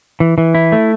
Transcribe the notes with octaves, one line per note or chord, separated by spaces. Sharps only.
E3
E3
E4
A3